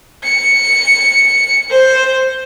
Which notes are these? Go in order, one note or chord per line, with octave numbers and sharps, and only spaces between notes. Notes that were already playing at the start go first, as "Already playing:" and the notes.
C#7
C5